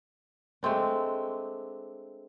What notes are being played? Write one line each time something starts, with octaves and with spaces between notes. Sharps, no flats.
G#3 A3 C4 D4